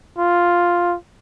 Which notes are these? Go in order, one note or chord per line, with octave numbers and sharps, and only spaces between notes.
F4